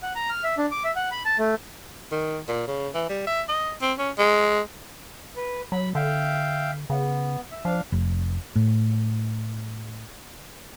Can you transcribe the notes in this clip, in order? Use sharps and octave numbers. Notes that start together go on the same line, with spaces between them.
F#5
A#5
F6
E5
D4
D6
E5
F#5
B5
A5
A3
D#3
A#2
C#3
E3
G3
E5
D#5
C4
C#4
G#3
B4
F#3 B5
D3 E5 F5 G5
C#3 B3
E5
F3 D4 F5
F1
A2